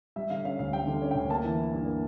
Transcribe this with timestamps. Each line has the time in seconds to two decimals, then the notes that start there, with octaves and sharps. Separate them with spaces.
0.16 G3 E5
0.30 D3 F5
0.45 C#4 F5
0.59 D2 F5
0.73 G3 G5
0.87 D3
1.02 C#4
1.11 D2 G5
1.30 A#3 A5
1.44 E3
1.58 E4
1.73 G2
1.86 A#3